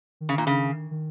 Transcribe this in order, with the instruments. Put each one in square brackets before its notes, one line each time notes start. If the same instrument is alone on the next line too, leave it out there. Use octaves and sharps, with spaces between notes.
[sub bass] D#3
[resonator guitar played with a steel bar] C#3
A#2
C#3
[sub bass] D#3